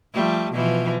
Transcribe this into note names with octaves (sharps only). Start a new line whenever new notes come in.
F3 G3 A3
B2 E3 F3